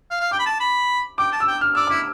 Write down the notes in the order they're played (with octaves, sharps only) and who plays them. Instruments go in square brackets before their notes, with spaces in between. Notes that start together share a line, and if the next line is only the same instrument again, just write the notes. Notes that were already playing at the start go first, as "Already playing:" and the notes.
[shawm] F5
F5
[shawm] G5 [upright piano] D6
[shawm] B5
A5
B5
[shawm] G5 [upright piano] D6
[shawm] A5
[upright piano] E6
[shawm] G5
[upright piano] F6
[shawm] D5 [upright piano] E6
[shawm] E4 [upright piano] D6